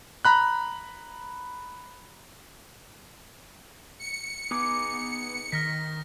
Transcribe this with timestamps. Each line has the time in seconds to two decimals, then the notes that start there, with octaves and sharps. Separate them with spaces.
0.25 A#5 B5 F#6
3.99 C#7
4.51 B3 D#4 G#4 D6
5.52 D#3 F6 A#6 B6